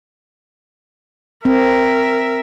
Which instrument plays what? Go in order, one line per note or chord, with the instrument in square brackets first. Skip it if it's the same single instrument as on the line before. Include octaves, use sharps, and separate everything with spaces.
[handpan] C4 [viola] A#4 E5